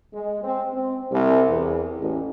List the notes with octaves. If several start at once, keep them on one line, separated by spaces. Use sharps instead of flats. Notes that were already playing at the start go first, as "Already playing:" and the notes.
G#3
C4
C4
C2
E2
A1